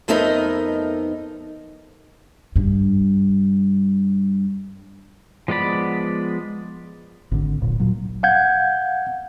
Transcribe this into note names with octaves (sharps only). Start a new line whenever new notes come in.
F2 A3 B3 D#4 A#4 D#5
G2 D4
F3 G#3 B3 D5 B5
G#1 D3
D1 A#2
A#2 F#3
F5 F#5 G6 G#6